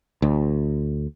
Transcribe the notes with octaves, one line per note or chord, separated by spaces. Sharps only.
D2